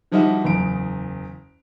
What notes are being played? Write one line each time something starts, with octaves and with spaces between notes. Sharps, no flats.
D3 F3 G3 D#4 E4 F#4
F#1 E2 D7